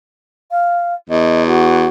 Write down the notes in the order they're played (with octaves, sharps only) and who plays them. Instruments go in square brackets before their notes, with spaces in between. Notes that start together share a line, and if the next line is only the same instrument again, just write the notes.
[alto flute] F5
[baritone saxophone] E2 [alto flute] D#5
[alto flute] F#4